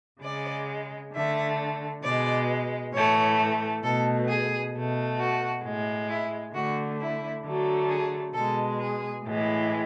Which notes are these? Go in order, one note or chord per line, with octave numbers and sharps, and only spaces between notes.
C#3 G#3 D5
D3 A3 E5
B2 G#3 D5
A2 E3 A3 C#5
B2 A3 A4
G#4
B2 A3
F#4
A2 G#3
E4
D3 A3 F#4
E4
D3 F#3 A3
G#4
B2 G#3 A4
G#4
A2 E3 G#3